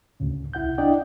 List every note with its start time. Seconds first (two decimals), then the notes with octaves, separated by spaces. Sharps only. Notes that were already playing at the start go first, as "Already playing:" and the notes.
0.20 D2 A2 C#3
0.54 C2 E4 F#5 G6
0.78 D4 E4 D5 D#5 G5